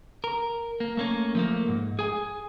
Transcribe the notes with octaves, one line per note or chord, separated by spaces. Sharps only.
A#4
A#3
A3 A#3 C#4
F3 A3 A#3
C#2 G#2
G#4 G#5